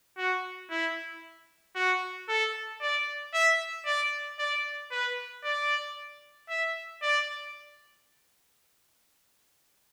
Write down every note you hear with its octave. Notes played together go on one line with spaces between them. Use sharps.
F#4
E4
F#4
A4
D5
E5
D5
D5
B4
D5
E5
D5